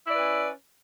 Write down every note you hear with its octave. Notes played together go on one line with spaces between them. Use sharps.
C#4 E4 B4 D5